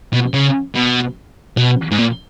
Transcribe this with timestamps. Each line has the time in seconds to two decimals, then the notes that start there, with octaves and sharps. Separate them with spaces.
0.13 B2
0.34 C#3
0.75 B2
1.57 B2
1.91 G#2
1.98 A#2